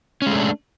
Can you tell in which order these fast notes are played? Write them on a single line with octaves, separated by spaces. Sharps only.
C#4 G#3 A3 D4